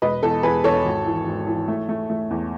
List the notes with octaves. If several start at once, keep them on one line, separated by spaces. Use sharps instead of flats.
E1 B4 D#5
E2 A4
E2 G#4 B4
E2 A4 C#5
G#1
E3
G#1
E3
A3
A3
A3
E2